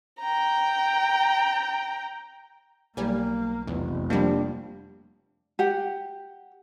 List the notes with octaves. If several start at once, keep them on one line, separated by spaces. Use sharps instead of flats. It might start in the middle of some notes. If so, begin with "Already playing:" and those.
G5 A#5
B1 G3 A#3 G#5
F1 E2
F3 G3 A#3 D4 G4
G4 F#5